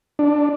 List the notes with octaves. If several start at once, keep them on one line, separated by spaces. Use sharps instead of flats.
D4